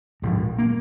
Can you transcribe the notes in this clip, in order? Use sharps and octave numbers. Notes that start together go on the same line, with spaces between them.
A#1 G#2
A#3